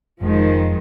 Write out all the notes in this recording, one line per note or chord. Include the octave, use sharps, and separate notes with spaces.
F1 D#3 F3 G#3